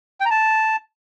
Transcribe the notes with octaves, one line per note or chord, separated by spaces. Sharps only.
G5
A#5
A5